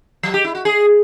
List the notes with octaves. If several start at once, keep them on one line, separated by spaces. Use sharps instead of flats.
F#3
G4
E4
F#4
G#4